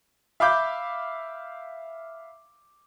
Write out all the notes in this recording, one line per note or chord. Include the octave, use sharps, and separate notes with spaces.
E5 F5 B5 D6 G6